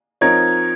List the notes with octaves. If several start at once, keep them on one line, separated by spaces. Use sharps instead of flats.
F3 C4 D#4 A#4 C#5 G#6